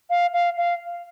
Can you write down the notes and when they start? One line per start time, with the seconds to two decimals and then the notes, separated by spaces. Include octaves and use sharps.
0.10 F5
0.33 F5
0.57 F5